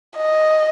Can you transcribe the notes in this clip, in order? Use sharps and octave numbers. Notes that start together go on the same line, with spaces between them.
D#5